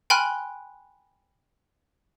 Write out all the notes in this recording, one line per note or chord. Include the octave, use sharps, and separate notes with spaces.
G5 G#5 B5 C6 F6 F#6